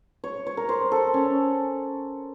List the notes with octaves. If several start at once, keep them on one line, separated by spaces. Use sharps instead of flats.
C#5
C#5
A#4
C5
A4
C#4